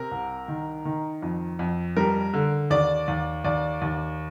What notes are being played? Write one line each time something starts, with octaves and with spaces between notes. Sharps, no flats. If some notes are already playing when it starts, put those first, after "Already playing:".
Already playing: C3 A#4
C2
D#3
D#3
F2
F2
G3 A#4
D3
D#2 D5
D#2
D#2 D5
D#2